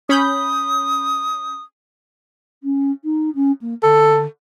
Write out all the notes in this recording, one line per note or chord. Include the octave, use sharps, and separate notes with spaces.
C#4 B5 D#6 G6
C#4
D#4
C#4
A#3
D3 A4